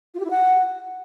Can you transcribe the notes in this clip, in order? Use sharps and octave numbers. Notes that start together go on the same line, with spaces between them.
F4
G4
E4
F#5